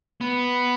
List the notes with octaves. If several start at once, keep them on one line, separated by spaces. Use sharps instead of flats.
B3